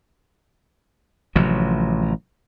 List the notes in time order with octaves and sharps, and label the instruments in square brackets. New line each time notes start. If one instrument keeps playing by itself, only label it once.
[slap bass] A1 C3 F3 F#3